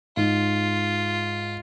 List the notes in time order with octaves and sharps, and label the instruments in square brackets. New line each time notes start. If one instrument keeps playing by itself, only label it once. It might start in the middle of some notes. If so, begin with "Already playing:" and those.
[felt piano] G#2 [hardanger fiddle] F4